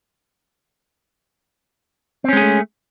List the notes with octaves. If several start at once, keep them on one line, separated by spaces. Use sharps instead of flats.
G#3 A3 C4 C#4 G#4